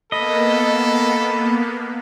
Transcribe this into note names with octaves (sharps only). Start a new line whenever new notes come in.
A#3 B3 A4 D#5 B5